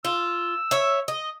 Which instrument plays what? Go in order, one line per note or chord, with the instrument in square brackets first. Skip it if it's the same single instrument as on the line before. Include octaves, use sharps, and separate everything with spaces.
[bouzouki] F4 [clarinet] E6
[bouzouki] C#5 E5
D#5